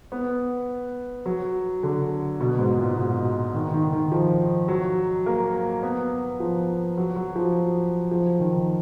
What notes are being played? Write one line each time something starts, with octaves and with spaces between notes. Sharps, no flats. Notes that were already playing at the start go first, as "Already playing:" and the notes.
B3
F#3
D3
B2
G#2
A#2
B2
D#3
D#3
D#3
F3
F#3
A#3
B3
F3
F#3
F#3
F3
F3
D#3